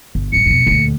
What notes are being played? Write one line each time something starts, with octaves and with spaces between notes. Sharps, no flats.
G1
A1 F#2 C#7
F2 B2
D2 A#2